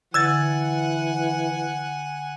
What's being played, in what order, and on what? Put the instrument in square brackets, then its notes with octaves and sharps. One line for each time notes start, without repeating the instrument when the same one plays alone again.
[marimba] D3 [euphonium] E3 [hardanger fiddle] F#5 G#5 [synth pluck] E6 G#6 A6